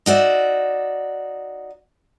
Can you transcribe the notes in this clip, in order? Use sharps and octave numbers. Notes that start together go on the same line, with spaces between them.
D#4 F#4 D5 E5